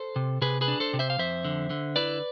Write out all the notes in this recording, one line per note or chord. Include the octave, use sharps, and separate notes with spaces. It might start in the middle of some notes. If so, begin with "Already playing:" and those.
Already playing: A4 C5
C3
C3 G#4 B4
G#4 B4
D4
A4 C5
C3
C5 E5
F5
F2 C5 E5
D3
D3
E4 B4 D5